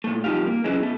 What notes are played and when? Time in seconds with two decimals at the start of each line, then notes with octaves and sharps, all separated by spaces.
0.04 A#2 A3
0.24 C2 F3 D#4 G4 F5
0.46 A#3
0.64 C#3 E3 F#3 G#3
0.80 B2 A3